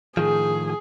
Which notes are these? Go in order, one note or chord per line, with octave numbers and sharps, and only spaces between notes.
A2 D#3 F3 G#4